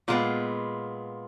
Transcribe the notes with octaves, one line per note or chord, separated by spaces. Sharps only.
A#2 G#3 B3 F4